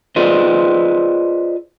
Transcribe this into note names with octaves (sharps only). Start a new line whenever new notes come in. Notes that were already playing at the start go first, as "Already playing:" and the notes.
F4 G#4 B4 C5 D5 D#5